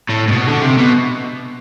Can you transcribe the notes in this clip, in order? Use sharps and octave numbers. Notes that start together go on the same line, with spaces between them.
A2
A2
B2
D3
C3
B2